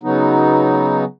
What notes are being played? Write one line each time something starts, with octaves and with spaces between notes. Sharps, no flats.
C#3 F#3 B3 D#4